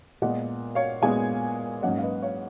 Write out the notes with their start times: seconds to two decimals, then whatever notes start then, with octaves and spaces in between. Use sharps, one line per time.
0.22 A#2 G#3 B3 D#5 F#5
0.75 C#5 F5
1.02 A#2 G#3 B3 F5 G#5
1.82 G#2 F#3 A#3 C#4 D#5 F#5
1.98 F5
2.02 B4 D#5
2.22 C#5 F5